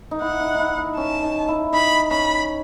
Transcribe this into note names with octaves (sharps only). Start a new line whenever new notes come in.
D#4
E4 F#5
D#4
D#4 E4
D#4
C#4 A5
D#4
E4
D#4 B5
C#4 B5